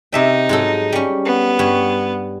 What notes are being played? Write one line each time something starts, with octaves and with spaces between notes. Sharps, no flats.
C3 D#4 E5 G5
G#2 F#3 A4
G3 C#4
B3
G2 G3 C#5